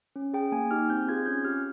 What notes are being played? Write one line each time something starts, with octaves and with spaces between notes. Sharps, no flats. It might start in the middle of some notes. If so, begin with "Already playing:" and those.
C#4
G#4 G5
A#3 G#5
D#4 G4 F6
C4 G6
F4 G#4 G#6
C#4 G6
G4 F6